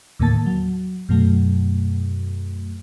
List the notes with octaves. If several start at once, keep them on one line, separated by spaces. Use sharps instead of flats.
D#2 A2 D3 A#3 A5 A6
F#3
F#2 B2 F#3 A3